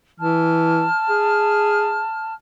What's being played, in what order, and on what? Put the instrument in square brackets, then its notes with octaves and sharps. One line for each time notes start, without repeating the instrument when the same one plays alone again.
[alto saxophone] E3 [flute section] A5 F6
[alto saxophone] G#4